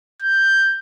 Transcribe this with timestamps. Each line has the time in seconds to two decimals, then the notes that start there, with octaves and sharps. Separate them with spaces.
0.22 G6